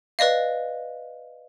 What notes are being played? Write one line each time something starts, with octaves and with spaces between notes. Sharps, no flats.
B4 D5 D#5 F5